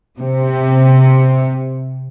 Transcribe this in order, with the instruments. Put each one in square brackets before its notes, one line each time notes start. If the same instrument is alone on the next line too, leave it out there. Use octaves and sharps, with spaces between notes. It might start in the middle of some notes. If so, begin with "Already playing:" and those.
[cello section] C3